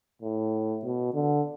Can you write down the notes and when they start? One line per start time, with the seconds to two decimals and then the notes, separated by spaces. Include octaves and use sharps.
0.22 A2
0.82 B2
1.14 D3